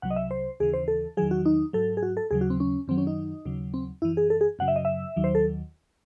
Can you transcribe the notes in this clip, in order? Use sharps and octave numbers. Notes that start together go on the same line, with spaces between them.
C2 C3 F#3 F#5
D#5
E5
C5
D#2 C#3 E3 G#4
C5
A4
E2 D#3 F#3 G#4
F#4
D#4
G#2 F#3 A4
G#4
F#4
A4
D#2 C#3 F#3 G#4
F#4
C4
C#4
F#2 D#3 F#3 C4
C#4
D#4
D#2 C#3 F#3
C4
F#2 E3 E4
G#4
A4
G#4
F#2 C#3 F#3 F#5
E5
D#5
E5
D#2 D#3 F#3
C5
A4